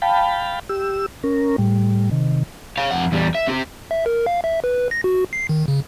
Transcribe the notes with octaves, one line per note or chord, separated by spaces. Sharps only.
F5 G5 A5 B5
G4 E6
C#4 A#4
A2 G3
C3 D#3
C#5 F5
F2 F#5
E2 G3
E5
C4 G4
E5
A#4
F5
E5
B4
A#6
F#4
C7
D#3
C#3